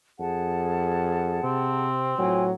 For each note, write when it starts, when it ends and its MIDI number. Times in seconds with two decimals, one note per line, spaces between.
0.20 1.42 41
0.20 1.86 68
0.20 1.86 78
0.20 1.86 81
1.44 2.17 48
1.44 2.49 60
2.19 2.54 45
2.19 2.51 54
2.19 2.44 65
2.19 2.44 79
2.19 2.44 80